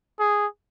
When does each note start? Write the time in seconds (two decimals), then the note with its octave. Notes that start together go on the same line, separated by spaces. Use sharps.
0.19 G#4